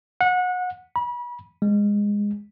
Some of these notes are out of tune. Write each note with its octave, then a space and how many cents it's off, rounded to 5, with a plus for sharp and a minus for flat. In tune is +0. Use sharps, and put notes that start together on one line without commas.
F#5 -25
B5 -35
G#3 -15